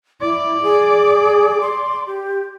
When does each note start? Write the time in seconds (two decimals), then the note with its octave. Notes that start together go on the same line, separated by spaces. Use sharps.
0.21 E4 D5
0.63 G#4
1.61 C6
2.07 G4